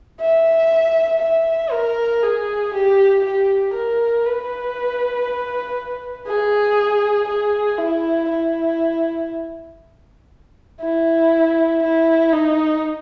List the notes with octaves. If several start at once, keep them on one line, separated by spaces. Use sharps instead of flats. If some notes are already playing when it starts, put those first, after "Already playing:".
E5
E5
A#4
G#4
G4
G4
A#4
B4
G#4
G#4
E4
E4
E4
E4
D#4